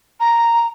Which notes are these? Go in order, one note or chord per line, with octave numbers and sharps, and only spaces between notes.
A#5